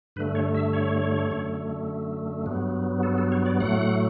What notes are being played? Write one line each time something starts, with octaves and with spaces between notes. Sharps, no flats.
G2 D3 A3 B4
C#5
E5
C#5
F#2 D3 A3
G2 F#3 B3
A4
A4
C#5
D5
A2 F#3 A3 F#5